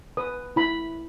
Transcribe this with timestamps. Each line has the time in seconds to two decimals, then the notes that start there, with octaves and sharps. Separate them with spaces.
0.17 B4 D#6
0.56 E4 B5